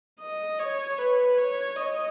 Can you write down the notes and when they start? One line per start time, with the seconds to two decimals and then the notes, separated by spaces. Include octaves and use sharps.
0.20 D#5
0.59 C#5
0.98 B4
1.37 C#5
1.77 D#5